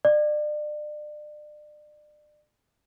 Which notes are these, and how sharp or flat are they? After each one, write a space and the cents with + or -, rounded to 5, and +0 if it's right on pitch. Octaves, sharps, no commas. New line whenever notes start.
D5 +35